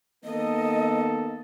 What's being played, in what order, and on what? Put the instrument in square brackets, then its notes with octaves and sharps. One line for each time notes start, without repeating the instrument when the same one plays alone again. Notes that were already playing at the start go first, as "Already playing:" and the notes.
[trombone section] D#3 A#3 B3 [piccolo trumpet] A4 [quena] D#5